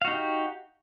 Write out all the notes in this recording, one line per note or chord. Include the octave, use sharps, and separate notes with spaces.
D#4 F#4 G4 F5